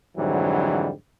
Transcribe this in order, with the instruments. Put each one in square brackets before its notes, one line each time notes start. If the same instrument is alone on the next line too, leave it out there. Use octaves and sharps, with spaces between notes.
[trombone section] F2 G#2 D3 E3 F#3 G3